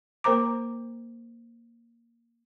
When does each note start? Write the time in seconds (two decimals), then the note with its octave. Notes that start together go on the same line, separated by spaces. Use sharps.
0.24 A#3 A#4 C5 A#5 D6